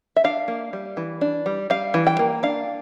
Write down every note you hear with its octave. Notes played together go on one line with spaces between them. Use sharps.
E5
D4 F5
A#3
G3
E3
D4
G3
G3 F5
E3
G5
A#3
D4 F5